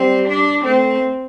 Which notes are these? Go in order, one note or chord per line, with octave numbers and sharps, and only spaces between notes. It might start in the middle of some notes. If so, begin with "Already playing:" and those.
Already playing: G3 C4
D4
A3 C4